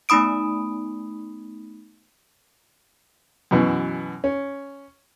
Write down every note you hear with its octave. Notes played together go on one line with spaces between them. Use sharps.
A3 B3 D#4 B5 D#6 D7
F#2 B2 E3
C#4